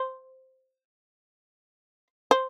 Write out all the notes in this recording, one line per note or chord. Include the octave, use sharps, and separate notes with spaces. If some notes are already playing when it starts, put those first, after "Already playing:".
Already playing: C5
C5